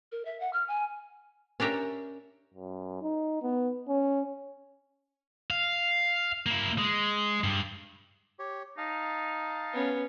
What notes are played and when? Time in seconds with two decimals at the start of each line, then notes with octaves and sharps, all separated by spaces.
0.12 A#4
0.25 E5
0.40 F#5
0.53 F6
0.68 G#5
1.60 C#4 D4 G4 A#4 E5
2.54 F#2
3.02 D#4
3.42 B3
3.88 C#4
5.50 F5
6.46 A#3 E4
6.78 G#3
7.44 G2
8.39 G4 C#5
8.78 D#4 F5 A5
9.74 B3 C#4